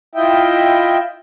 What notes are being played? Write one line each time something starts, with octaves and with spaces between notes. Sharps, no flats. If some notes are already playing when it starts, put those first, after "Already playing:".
E4 F4 D#5 E5 G5